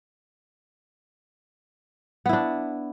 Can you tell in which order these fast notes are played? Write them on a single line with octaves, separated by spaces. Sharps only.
B3 E4 D4